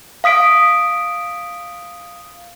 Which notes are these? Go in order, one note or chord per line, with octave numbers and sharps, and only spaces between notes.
F5 D#6 B6 D7